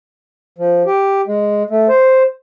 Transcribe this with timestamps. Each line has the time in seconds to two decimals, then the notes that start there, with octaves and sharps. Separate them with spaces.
0.58 F3
0.86 G4
1.27 G#3
1.70 A3
1.89 C5